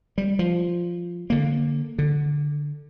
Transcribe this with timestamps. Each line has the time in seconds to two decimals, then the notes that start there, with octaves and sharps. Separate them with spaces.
0.18 G3
0.39 F3
1.30 D3 A#3
1.99 D3